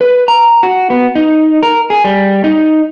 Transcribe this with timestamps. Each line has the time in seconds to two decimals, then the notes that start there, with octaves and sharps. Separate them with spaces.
0.01 B4
0.28 A#5
0.63 F#4
0.90 B3
1.15 D#4
1.63 A#4
1.90 G#4
2.04 G3
2.44 D#4